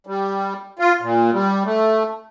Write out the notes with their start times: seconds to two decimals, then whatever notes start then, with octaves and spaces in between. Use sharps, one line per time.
0.07 G3
0.79 F4
1.02 A#2
1.33 G3
1.65 A3